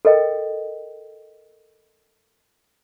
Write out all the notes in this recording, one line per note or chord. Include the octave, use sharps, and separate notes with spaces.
A4 A#4 D#5 G5